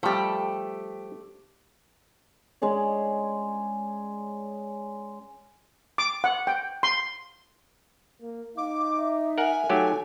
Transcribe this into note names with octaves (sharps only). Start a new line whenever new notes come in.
F3 G3 A3 G4
G#3 C#4 G#4 D5
D6
F#5
G5
C6
A#3
D#4 F5 D6
E5
A#4 F#5 G#5
F#3 A3 D#4 G4 A4